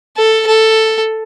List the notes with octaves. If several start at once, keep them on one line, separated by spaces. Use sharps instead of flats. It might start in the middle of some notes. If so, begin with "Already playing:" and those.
A4
A4